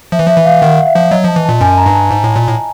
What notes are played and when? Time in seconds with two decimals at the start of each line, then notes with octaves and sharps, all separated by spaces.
0.12 F3 E5
0.19 E3
0.26 F3 E5
0.37 E3
0.45 F5
0.61 D#3 F#5
0.87 E5
0.95 F3
1.11 F#3 D#5
1.24 F3 A5
1.36 E3
1.45 A5
1.49 A#2
1.61 F#2 G#5
1.78 A#5
1.86 G2
1.94 A5
2.11 G#2
2.24 A2
2.36 A#2
2.48 A2